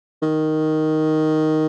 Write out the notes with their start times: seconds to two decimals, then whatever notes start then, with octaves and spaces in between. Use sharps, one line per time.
0.22 D#3